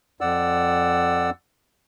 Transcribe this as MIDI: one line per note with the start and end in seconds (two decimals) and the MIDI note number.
0.21 1.30 41
0.21 1.30 74
0.21 1.30 78
0.21 1.30 88